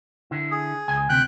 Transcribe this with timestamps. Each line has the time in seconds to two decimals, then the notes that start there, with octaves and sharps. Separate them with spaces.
0.31 D3 E4
0.51 G#4
0.88 C#2 G#5
1.09 D2 C3 G5 F#6